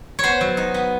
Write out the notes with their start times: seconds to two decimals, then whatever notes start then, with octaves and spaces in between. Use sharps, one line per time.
0.19 B3 C5 C#5
0.41 F#3
0.57 D#4
0.74 B3